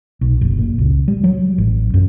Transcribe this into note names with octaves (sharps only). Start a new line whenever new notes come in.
B1
F#1
A#2
C#2
G3
F#3
A1
F#2